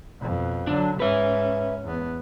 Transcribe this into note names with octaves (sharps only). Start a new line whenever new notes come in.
F2 B2
D3 F#3 D4
G#2 C#4 B4 E5
E2 B3